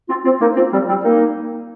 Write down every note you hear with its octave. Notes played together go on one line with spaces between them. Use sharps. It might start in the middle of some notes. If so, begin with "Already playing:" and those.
C4 F4
C4 F4
A#3 D#4
C4 F4
G3 C4
G3 C4
A#3 D#4